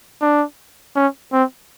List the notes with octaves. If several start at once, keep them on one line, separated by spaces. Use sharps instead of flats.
D4
C#4
C4